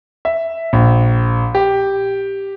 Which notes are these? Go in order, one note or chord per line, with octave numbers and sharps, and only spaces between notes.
E5
A#1
G4